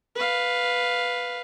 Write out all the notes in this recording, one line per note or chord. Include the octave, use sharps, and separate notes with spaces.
B4 F5